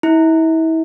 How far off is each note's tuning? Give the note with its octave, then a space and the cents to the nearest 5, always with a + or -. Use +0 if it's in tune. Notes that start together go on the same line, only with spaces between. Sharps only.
E4 -35